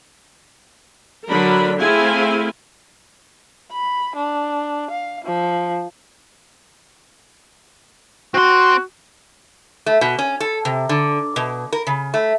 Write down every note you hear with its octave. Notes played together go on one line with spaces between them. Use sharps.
D3 F#3 D4 A#4 B5
A3 C4 E4 G#4 F5 G#5
B5
D4
F5
F3
C4 F#4 C6
A3
B2
C#4
A4
C3
D3
B2
A#4
C#3
A3